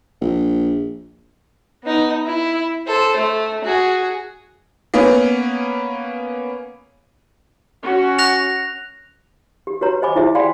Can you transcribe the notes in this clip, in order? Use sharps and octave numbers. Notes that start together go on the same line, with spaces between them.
A#1
B3 D#4
E4
A4 C5
A3
F#4 G#4
A#3 B3 C#4
C#4 F#4
F#6 A#6 F7
G4
F#4 G4 B4 C#5 A#5
C5 D#5 G#5 B5 D6
E4 F4 G4 G#4 C5 E5
D5 F5 G5 G#5 B5 C6